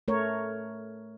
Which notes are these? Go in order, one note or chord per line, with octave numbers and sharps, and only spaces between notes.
A3 A#4 C#5